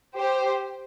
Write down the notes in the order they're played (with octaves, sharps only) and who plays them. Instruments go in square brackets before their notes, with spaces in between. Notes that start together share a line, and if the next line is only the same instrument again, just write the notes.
[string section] G4 C5